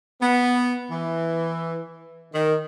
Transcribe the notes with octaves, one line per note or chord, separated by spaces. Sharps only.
B3
E3
D#3